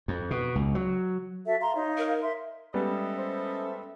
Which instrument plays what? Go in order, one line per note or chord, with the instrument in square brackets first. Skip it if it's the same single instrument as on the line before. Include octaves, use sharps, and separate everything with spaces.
[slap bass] F2
B2
C#2
F#3
[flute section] F#4 A4 E5
F5 A#5 C6
D#4 C#5 F5
[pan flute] A#4
[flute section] E5 C6
[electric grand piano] G3 G#3 B3 [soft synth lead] C#4 [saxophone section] A4 D#5 E5
[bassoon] C5